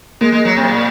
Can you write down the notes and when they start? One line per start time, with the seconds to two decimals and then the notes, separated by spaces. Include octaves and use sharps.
0.21 G#3 A#3
0.32 G#3
0.45 F#3
0.56 C3
0.68 A#2